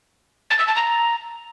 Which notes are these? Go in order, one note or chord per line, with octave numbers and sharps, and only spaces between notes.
A6
E6
A5
A#5